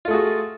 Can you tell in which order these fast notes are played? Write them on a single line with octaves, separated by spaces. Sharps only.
F4 A3 G#4 F#4